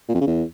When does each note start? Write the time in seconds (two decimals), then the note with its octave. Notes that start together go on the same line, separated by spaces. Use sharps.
0.09 A#2
0.15 F2
0.21 C#3
0.27 E2